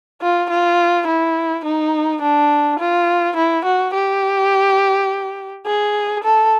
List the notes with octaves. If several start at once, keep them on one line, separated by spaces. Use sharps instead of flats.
F4
F4
E4
D#4
D4
F4
E4
F#4
G4
G#4
A4